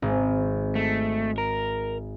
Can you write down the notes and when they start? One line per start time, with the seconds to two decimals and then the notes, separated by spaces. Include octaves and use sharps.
0.02 G#1
0.75 A3
1.38 A#4